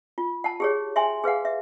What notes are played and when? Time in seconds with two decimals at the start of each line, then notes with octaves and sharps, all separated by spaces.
0.18 F4
0.44 F#5 A5
0.60 G4 G#4 C#5
0.96 E5 G5 G#5 C6
1.24 G#4 B4 F5 F#5
1.45 E5